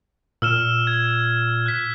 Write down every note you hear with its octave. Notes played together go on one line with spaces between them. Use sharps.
A#2 E6 F6 E7
G#6
F#6 B6